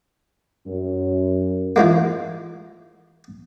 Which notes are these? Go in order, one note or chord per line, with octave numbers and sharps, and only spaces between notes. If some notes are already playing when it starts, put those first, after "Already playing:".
F#2
E3 F3 G#3 A#3